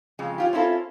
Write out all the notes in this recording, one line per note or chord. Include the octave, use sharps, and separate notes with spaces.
F2 C#3 G#3
C#4 F4 G4
C4 C#4 E4 F4 A4